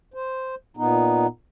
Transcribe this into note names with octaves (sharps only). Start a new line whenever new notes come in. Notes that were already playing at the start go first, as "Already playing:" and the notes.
C5
A#2 B3 D#4